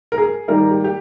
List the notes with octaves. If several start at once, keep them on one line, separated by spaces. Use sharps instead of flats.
A#4
G#4
G#2 D#3 G3 A#3 D#4 A#4
G4
G4